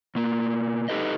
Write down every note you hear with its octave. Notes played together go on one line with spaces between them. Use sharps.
B2 A#3
D#4 G4 A4 B4 D#5